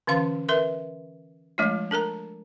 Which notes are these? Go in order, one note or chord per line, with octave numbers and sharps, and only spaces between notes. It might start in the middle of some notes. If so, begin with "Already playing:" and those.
D3 E3 C#4 F5 C6
A#4 B4 E5 C6
F3 G#3 A3 D4 F4
D4 A4 A#4 A#5